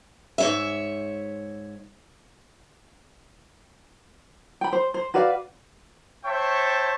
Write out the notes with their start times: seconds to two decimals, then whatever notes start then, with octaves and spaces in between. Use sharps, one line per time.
0.38 G#2 C#5 E5
4.61 G5 B5
4.73 C5
4.94 C5
5.14 F#4 B4 D5 F5
6.25 C5 C#5 E5 G5 A5 C#6